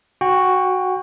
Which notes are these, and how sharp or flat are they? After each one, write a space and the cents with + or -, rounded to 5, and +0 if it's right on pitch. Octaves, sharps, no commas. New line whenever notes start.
F#4 +0 G5 +25